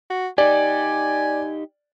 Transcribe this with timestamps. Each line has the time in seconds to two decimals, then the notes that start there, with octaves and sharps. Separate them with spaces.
0.10 F#4
0.38 D#4 G4 D5 G#5